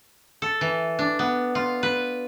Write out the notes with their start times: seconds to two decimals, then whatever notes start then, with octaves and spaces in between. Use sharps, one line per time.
0.42 A4
0.61 E3
0.99 D4
1.19 B3
1.55 F4
1.83 B4